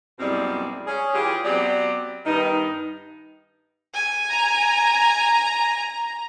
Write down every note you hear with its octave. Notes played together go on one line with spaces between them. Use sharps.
F#2 B2 G3 G#3 C4 E4
C#4 G#4
E3 F4 G4 G#4
F#3 B3 C4 G4 D5
G2 D#3 B3 D#4
G#5
A#5